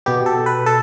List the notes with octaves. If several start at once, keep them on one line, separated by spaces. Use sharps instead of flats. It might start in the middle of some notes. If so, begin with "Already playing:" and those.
B2 B3 G4
A4
B4
A4